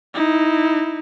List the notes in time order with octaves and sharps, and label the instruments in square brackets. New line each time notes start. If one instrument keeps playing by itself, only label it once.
[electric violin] D#4 E4